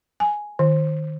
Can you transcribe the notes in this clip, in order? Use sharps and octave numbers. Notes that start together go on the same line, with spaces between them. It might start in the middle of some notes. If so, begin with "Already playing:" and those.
G#5
D#3